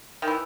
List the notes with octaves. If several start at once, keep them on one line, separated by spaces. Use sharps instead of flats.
D#3
E3